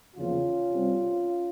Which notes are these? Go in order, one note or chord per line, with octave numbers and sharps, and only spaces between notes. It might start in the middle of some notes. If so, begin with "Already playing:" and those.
E2 C#3 F3 A#3 C#4 F4
C3 G3 C4